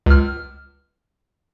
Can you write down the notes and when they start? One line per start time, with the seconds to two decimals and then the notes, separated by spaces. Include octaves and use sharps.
0.06 C#2 F6